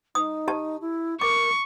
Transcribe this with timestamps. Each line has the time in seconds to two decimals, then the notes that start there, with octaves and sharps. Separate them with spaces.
0.15 D#4 D#6
0.48 G4 A5
0.81 E4
1.21 A#4 C#6 D6